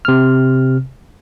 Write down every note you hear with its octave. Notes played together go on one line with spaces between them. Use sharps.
C3 F6